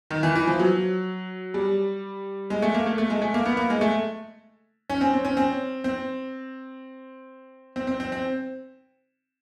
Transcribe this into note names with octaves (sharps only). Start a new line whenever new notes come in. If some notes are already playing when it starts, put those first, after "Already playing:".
D#3
E3
E3
F3
F#3
G3
G#3
A3
A#3
A3
A3
G#3
A3
A#3
B3
A#3
G#3
A3
C#4
C4
C4
C#4
C4
C4
C4
C4
C4
C4